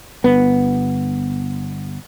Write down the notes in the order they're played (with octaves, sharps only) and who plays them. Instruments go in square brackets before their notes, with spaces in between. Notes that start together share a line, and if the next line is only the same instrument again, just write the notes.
[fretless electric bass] G1 B3